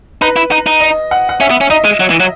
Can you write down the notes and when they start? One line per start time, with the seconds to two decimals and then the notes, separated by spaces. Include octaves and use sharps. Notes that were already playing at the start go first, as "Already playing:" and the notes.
0.22 D#4 B4
0.36 E4
0.52 D#4
0.66 D#4
0.81 D#5
1.11 F#5
1.29 F#5
1.40 C#4 E5
1.50 B3
1.61 C#4
1.70 D#4 D#5
1.85 G#3
2.00 F#3
2.10 E3
2.20 F#3